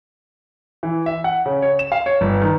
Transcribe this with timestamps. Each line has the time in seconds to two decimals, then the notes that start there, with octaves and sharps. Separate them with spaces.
0.83 E3
1.06 E5
1.24 F#5
1.46 C#3
1.62 C#5
1.79 E7
1.92 F5
2.06 C#5
2.21 G1
2.41 D#3